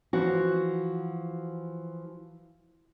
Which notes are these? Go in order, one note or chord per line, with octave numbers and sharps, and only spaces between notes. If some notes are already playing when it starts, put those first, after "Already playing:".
E3 F3 F#4